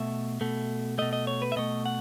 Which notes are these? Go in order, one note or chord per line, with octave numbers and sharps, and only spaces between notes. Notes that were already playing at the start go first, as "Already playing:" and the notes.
Already playing: B2 A3 E5
B2 A3
B2 A3 D#5
D#5
C#5
B4
E5
B2 A3 D#5
F#5